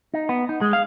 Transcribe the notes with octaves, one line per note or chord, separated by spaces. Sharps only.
D#4
B3
D#4
G#3
F5